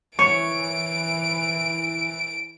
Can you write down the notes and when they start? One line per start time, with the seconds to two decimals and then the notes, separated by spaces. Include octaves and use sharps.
0.19 E3 C#5 C#6 D7